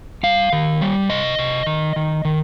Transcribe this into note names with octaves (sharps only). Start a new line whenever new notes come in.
G3 F5
D#3
G3
C3 D#5
C3
D#3
D#3
D#3